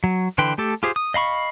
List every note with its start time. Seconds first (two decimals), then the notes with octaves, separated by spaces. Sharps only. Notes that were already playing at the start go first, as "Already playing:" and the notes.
0.04 F#3
0.38 D3 E3 B4 G5 C6
0.58 A3 G4 A4
0.83 F4 G4 G#4 C5
0.96 D#6
1.14 D#5 F5 B5 C#6